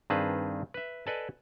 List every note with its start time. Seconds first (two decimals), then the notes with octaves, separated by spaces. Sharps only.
0.10 G2 D#3 C4 G#4 B4 A5
0.74 B4 E5
1.07 A4 B4 D5 D#5 G#5 A5